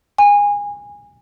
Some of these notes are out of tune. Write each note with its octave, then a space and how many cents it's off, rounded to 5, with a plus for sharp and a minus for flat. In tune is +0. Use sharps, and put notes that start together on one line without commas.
G#5 -20